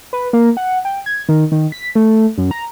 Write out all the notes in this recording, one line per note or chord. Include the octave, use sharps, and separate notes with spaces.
B4
A#3
F#5
G5
G#6
D#3
D#3
B6
A3
F#2
A#5